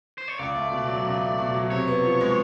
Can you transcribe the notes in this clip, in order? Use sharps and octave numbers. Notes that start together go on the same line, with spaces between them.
C5
C#5
C#2 D5
A3
B2
F#3
C#2
A3
B2
F#3
C3 C#5
B3
F3
G#3